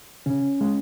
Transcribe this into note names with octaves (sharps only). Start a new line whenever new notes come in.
C#3 C#4
G#3